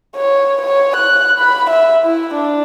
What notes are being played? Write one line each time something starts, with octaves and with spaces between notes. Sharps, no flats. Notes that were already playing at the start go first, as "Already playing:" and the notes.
C#5
C#5
F#6
B5
E5
E4
D4